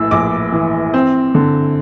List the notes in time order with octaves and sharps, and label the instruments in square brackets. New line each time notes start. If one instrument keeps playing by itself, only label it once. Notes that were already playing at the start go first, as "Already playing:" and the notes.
Already playing: [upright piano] A#1 A2 E6
A#1 D6
E3
C4
D3